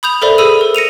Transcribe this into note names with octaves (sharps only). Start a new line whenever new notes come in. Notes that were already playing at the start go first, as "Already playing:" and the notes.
B5 D#6 G6 F7
A4 A#4 C5 D5 E5 B5
G#4 B5 D#6 E6 D#7
A#4
A#6 C#7 D#7 F7